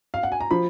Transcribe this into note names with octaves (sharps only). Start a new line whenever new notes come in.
F5
F#5
G#5
A#5
F3 B5